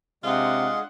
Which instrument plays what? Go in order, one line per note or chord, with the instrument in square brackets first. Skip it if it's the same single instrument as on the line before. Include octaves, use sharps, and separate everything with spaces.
[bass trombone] C3 [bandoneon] G#3 G#4 [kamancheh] D4 F#5 [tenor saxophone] F4